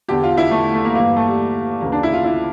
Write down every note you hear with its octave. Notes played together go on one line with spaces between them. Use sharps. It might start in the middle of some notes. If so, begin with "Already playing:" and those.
E2 D3 G4
F4
E4
A3
A3
A#3
G2 E3 A#3
A3
G3
D2 C#3 E3 A#3
D4
E4
F4
E4